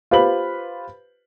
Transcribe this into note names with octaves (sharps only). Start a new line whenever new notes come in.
F4 G4 B4 C5 B5 F#7